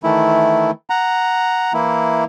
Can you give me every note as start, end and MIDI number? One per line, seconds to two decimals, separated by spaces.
0.03 0.71 51
0.03 0.71 52
0.03 0.71 57
0.03 0.71 64
0.90 1.73 78
0.90 1.73 82
1.74 2.24 52
1.74 2.24 58
1.74 2.24 64